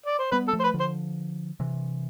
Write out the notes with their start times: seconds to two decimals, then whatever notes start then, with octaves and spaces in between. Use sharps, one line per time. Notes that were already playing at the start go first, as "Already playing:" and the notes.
0.06 D5
0.19 C5
0.32 G3 B3 B4
0.48 A4
0.53 F3 A3
0.60 C5
0.64 B4
0.74 D3 F3
0.80 C5
1.60 C3 E3